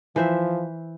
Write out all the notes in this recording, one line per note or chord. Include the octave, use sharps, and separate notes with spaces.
E3 F3 C5 E5